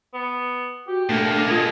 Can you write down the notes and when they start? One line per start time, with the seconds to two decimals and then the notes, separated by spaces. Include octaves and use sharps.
0.14 B3
0.88 F#4 G4
1.09 B2 A3 A#3 D4
1.50 F4 A4 D#5 G#5 D#6